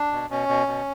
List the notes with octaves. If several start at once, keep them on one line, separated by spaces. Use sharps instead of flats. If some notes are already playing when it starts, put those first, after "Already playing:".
Already playing: D4
B2
B2 C#4
B2
B2